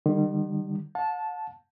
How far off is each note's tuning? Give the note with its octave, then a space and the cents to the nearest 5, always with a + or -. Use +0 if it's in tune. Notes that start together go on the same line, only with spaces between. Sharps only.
D#3 -40 G3 +0
F#5 -45 A5 -10